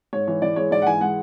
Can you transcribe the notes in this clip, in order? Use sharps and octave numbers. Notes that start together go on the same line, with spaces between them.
G#2 C#5
E3 C#5
E3 D5
G#3 C#5
G#2 D5
F#5
E3 G#5
G#3 F#5